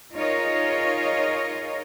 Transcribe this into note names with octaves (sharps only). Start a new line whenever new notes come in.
D#4 F4 G#4 A#4 C#5 D#5